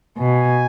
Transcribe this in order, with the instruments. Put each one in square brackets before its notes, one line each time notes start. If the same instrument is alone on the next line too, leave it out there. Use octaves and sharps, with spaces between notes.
[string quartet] B2 [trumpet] G#5